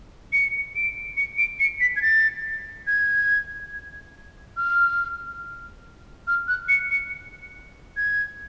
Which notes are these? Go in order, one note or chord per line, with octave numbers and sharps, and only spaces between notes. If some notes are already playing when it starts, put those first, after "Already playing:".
C#7
D7
C#7
D7
C#7
B6
G#6
A6
G#6
F6
F6
F#6
C#7
C#7
G#6